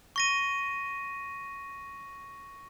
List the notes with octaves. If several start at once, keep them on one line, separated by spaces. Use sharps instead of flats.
C#6 A#6 D#7